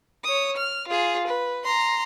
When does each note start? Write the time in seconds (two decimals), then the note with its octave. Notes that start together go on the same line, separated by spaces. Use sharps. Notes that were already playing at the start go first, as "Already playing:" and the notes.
0.24 C#5 D#6
0.56 F6
0.88 F4 G#4
1.27 B4
1.64 A#5 C6